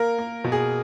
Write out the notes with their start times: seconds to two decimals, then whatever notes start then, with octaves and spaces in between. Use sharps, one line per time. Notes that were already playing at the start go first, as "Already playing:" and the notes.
Already playing: A#3 A#4
0.18 A#3
0.44 B2
0.52 G#4